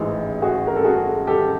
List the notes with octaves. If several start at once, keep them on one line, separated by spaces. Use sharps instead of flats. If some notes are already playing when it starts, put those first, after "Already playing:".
Already playing: A1 G#2 E3
F#4 G#4
A#4
A4
F#4 G#4
G4 A4